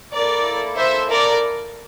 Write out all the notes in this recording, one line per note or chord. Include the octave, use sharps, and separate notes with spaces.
A#3 E4 A4 A#4 D5
C5 E5
A#4 D5